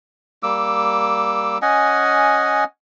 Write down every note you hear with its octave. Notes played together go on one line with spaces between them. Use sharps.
G3 A#3 D6 E6
C#4 D#5 F#5 G#5